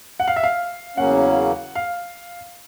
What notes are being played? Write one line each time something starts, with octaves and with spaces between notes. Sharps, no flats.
F#5
F5
E5
F5
E2 C#3 F#3 A#3 C#4 F#5
F5